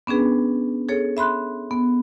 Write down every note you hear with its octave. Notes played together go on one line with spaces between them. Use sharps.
B3 C#4 D4 G#4 B4
G#4 A4 C#5
E5 B5 C6 F#6
B3